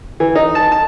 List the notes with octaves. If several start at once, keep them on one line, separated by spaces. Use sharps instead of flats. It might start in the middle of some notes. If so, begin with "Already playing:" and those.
E3
D#4
A5
A5